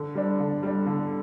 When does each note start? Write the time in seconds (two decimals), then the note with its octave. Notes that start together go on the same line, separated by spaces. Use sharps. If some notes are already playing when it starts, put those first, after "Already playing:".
Already playing: D3
0.15 G3 D4
0.39 D3
0.63 G3 D4
0.86 D3